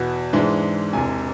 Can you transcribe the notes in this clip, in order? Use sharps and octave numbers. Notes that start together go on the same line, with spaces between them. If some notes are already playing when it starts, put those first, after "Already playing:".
Already playing: E2 B2 B3
G#2 E3 G#3 D4
E1 E2 C3 G#5